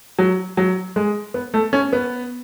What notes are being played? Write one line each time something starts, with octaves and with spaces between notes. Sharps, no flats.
F#3
F#3
G#3
B3
A3
C#4
B3